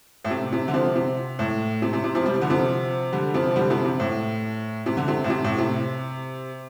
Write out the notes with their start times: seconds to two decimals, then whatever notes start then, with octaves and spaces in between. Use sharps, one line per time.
0.25 A2
0.30 C3
0.52 C3
0.68 D3
0.74 C3 F3
0.95 C3
1.39 A2
1.82 C3
1.93 C3
2.04 C3
2.15 C3 F3
2.26 G3
2.34 F3
2.41 D3
2.50 C3 F3
3.13 D3 G3
3.34 C3 F3
3.51 F3
3.56 D3 G3
3.70 C3 F3
3.84 C3
4.00 A2
4.86 C3
4.97 D3
5.08 C3
5.24 A2
5.30 C3
5.44 A2
5.58 C3